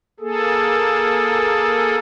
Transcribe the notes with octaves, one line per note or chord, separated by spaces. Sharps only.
A#3 G#4 A4